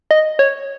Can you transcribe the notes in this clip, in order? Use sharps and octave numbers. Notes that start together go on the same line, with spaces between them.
D#5
C#5